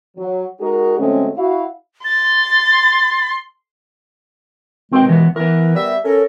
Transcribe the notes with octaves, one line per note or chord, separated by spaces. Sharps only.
F#3
G#3 D#4 F#4 G#4 A#4
D3 F#3 G#3 A3 C4 C#4
E4 F#4 F5
C6 A6
D#2 B2 G#3 C4 G5
E3 B3
E3 B3 A#4
G3 E5
C#4 A4 A#4